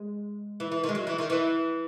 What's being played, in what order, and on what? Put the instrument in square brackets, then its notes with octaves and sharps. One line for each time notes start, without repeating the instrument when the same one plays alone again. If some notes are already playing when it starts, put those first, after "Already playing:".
Already playing: [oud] G#3
E3
E3
D#3
G#3
F#3
E3
D#3
E3